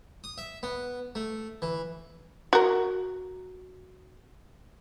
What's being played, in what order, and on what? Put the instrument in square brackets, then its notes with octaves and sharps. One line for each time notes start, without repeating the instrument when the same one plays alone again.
[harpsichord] D#6
E5
B3
A3
E3
[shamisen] F#4 A#4